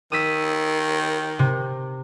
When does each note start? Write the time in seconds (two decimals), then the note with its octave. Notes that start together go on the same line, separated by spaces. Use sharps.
0.12 D#3 D#6 E6 B6
1.39 C3